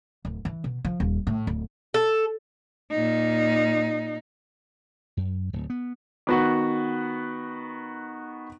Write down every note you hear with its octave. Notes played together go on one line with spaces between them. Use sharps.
D1
E3
B2
F3
D#1
A2
D1
A4
A#2 D#4
F#2
D1
B3
D#3 B3 F#4